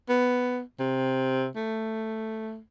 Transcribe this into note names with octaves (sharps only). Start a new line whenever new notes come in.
B3
C3
A3